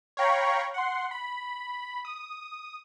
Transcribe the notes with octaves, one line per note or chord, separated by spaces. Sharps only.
C#5 F5 G5 A#5 B5 C#6
F#5 C6
B5
D#6